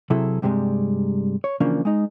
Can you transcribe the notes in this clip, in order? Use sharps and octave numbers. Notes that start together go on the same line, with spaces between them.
C3 F#3 E4 G#4 A4
G2 C3 E3 G3 G#3
C#5
C#3 E3 F3 A#3 C#4 D4
G#3 D#4